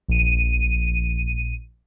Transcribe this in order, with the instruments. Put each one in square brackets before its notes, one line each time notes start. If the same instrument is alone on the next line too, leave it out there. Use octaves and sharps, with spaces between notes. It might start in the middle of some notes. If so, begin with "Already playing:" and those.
[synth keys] A#1 D#7